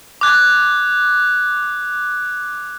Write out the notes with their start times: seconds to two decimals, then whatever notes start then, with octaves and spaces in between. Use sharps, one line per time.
0.21 D6 F#6 G#6